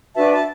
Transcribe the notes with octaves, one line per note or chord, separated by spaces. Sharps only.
D4 F#4 B4 E5 A5
A5